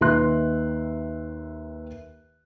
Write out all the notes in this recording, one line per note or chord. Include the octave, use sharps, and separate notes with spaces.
D#2 D#3 B4 E5 C6 F#6